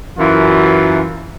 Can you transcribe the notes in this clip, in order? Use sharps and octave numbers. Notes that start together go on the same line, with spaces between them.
F#2 E3 F4